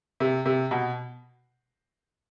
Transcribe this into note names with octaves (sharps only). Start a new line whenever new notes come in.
C3
C3
B2